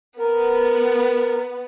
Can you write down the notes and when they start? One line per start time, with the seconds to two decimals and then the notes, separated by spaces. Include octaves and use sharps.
0.19 B3 A#4